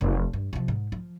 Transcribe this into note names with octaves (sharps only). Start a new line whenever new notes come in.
F1
G2
C3 F3
G#2
F3